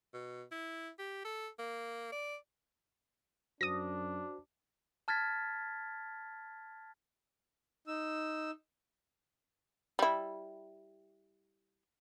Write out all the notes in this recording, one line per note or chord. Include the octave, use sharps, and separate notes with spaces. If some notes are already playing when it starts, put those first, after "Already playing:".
B2
E4
G4
A4
A#3
D5
F#2 D4 F#4 C5 D#6 A#6
A5 F6 G#6 A6 B6
D#4 E6
G3 E4